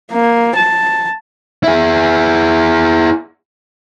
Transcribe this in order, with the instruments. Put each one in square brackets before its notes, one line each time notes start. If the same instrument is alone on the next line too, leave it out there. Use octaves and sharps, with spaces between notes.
[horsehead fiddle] A#3
A5
[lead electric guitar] E4 G#4